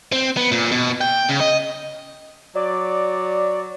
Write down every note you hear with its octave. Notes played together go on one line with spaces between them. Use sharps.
C4
B3
A#2
B2
G5
C#3
D#5
F#3 D5